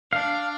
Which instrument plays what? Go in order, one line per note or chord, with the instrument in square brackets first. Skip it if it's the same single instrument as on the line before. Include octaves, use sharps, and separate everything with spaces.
[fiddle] D4 [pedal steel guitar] F5